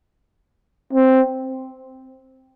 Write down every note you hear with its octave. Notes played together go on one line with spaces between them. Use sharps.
C4